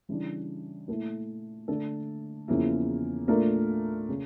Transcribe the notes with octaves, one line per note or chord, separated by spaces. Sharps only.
C#3 E3 G3 D4
A#2 A3 E4 A4
D3 A3 D4 A4
E2 C#3 F3 A#3 E4
A#2 A3 D4 F4 A#4
C#3